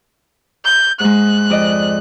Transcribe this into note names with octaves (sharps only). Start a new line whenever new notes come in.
G6
G#2 G#3 F#6
F2 D5 D#5